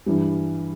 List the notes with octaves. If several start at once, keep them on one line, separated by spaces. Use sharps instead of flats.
G2 E3 G3